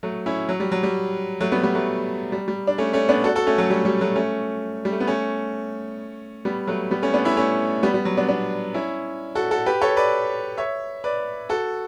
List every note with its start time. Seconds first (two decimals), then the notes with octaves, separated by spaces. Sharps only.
0.03 F#3 A3
0.26 C#4 E4
0.49 F#3
0.60 G3
0.72 F#3
0.83 G3
1.41 F#3 A3
1.52 G3 B3
1.63 G3 B3
1.75 F#3 A3
2.32 G3
2.48 G3
2.67 D4
2.78 A3 C#4
2.93 A3 C#4
3.09 B3 D4
3.24 F#4 A4
3.35 F#4 A4
3.47 A3 C#4
3.58 F#3 A3
3.70 G3
3.85 G3
4.01 F#3 A3
4.16 A3 C#4
4.85 G3
4.92 A3
5.00 B3
5.07 A3 C#4
6.45 G3 B3
6.67 F#3 A3
6.91 G3 B3
7.02 A3 C#4
7.14 B3 D4
7.25 C#4 E4
7.37 A3 C#4
7.83 G3 B3
7.94 G3
8.05 F#3
8.17 B3 D4
8.28 B3 D4
8.74 C#4 E4
9.35 F#4 A4
9.51 F#4 A4
9.66 G4 B4
9.81 A4 C#5
9.97 B4 D5
10.57 C#5 E5
11.04 B4 D5
11.49 F#4 A4